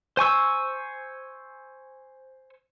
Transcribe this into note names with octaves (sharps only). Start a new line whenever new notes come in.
C5 G#5 C#6 E6